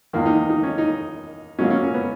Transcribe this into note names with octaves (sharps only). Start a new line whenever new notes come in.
E2 D#3 A#3
D#4
D#4
C#4
D#4
B2 F#3 A#3 C#4
C#4
C#4
B3